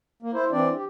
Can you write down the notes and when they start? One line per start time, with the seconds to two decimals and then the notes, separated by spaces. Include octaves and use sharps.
0.22 A#3
0.34 E4 C5
0.52 E3 C4 D4 D5
0.76 G4